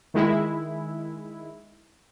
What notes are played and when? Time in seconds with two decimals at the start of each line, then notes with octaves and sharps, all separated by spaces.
0.14 D#3 G#3 E4